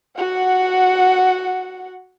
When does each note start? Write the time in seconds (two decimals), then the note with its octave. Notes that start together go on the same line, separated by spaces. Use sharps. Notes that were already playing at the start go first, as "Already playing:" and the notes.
0.17 F#4 F#5